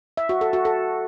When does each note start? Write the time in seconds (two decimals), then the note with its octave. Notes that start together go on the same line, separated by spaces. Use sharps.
0.17 E5
0.29 F#4
0.41 A4
0.53 F#4
0.65 A4